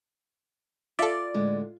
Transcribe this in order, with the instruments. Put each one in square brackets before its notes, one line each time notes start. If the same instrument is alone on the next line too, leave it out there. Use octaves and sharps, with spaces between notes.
[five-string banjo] F4 [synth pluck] A4 E5 [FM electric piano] D5
[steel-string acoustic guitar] A2 D3 G#3